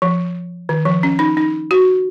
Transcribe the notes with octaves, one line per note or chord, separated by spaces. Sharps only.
F3
D#3
F3
C#4
D#4
D#4
F#4